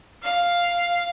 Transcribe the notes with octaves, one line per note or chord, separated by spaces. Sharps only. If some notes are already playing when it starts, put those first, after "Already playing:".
F5